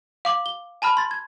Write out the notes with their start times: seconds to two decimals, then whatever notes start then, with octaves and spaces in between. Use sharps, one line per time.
0.25 F5 D6 F#7
0.46 G7
0.82 G#5 A5 B5 F6
0.97 C6 A6
1.11 G#6